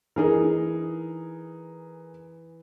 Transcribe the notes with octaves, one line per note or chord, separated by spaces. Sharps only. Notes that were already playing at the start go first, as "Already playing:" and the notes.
E3 D#4 G#4 A#4